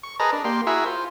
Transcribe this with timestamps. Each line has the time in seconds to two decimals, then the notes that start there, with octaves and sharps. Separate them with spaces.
0.03 C#6
0.20 G#4 A#4 B4 D#5 A5 A#5
0.32 D4
0.44 A#3 G4 C6
0.67 E4 F#4 G#4 A#4 E5
0.86 F4 C5